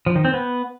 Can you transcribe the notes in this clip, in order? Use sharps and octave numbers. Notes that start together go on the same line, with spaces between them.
F3
D#3
C4
B3